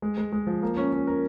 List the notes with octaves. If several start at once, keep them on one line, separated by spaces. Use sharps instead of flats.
G#3
G#3
G#3
F3
A#3
C#4
C#4
A#4